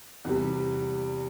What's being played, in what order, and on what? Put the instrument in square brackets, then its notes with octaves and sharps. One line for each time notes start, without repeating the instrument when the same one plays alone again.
[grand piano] E2 C3 G3